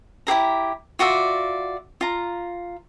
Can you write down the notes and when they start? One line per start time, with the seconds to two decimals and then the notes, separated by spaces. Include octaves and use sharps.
0.27 E4 G4 G#4 A#5
0.99 F4 F#4 D5 E5
2.01 F4 A#5